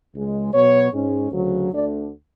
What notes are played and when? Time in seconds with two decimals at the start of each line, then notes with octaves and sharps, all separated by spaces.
0.14 C#2 C#3 G#3
0.53 B2 F#3 B3 C#5
0.92 G#2 G#3 C#4
1.32 D2 C#3 F#3
1.71 D2 D3 A3 D4 D5